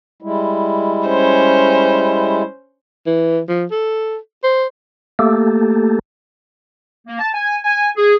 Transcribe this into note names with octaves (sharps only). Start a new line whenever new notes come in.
G3 G#3 E4
C#4 C5
E3
F3
A4
C5
A3 A#3 G4 A4
A#3
A5
G#5
G#5
G#4